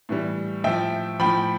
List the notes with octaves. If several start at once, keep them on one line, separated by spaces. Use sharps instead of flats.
A2 E3 G3
A2 F3 E5 G5
A2 F3 G5 B5